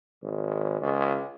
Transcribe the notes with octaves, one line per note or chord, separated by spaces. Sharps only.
G#1
C#2